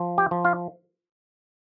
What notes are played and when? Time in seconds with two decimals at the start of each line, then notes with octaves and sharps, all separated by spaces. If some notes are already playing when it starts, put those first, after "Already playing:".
Already playing: F3
0.18 G4 G5
0.31 F3
0.45 F4 F5